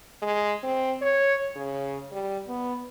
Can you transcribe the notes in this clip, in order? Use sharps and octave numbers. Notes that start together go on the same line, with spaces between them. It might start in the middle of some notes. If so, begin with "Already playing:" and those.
G#3
C4
C#5
C#3
G3
B3